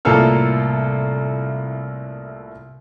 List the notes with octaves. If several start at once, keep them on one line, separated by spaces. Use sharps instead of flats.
C2 A2 A#3 F4 A4 F6